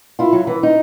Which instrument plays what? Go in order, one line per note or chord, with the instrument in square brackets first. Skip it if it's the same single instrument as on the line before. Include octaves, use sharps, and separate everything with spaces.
[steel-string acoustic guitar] E4 F4
F#3
E3
D#4